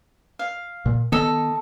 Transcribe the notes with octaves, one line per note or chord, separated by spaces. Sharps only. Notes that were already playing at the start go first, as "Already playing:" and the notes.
F5
A#2
D#3 B3 A4 D#5